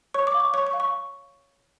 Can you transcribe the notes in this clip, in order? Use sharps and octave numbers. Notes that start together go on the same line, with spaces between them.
C#5 C#6
D6
F5
C#6
C#5 C#6
C#6
F5
C#6